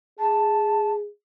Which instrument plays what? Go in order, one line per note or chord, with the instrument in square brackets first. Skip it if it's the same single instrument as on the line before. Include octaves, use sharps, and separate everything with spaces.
[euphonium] G#4 [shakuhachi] A5